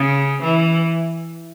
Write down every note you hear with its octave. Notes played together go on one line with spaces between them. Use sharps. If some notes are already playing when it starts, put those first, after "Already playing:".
Already playing: C#3
E3